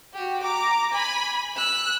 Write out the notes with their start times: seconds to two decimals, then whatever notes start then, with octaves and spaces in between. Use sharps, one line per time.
0.14 F#4 G4
0.43 A#5 D6
0.93 G#5 B5
1.56 E6 F#6